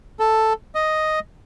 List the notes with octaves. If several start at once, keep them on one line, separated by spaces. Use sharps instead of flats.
A4
D#5